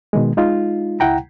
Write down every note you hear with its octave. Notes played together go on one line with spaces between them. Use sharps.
B2 D#3 G#3
G#3 D#4 F4
C#2 E4 F#5 G5 A#5